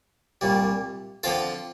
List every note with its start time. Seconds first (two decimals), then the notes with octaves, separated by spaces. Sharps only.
0.41 C2 A#2 G3
1.23 D3 F3 C4 F4 A4